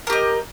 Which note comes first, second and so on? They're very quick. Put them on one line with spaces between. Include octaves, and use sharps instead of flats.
A#4 G4 D#5